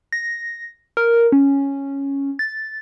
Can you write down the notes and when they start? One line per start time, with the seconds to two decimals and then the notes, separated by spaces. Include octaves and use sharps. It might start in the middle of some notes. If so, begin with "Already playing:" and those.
0.12 A#6
0.97 A#4
1.32 C#4
2.39 A6